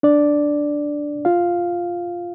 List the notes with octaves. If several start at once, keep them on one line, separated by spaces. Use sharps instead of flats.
D4 D5
F4 F5